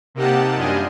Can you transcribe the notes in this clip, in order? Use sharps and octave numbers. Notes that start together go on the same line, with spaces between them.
C3 A#3 D#4 G4 F#5 A5
F#2 G3 D4 F4 D#5 G#5